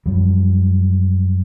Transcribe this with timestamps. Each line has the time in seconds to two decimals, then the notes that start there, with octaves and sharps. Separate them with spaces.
0.06 F#2 F3 G3